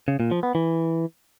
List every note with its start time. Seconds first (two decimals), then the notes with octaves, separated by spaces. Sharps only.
0.08 C#3
0.20 A#2
0.31 F3
0.43 B3
0.55 E3